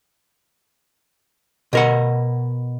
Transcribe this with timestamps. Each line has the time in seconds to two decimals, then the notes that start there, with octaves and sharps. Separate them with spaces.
1.73 B2 A#4 F#5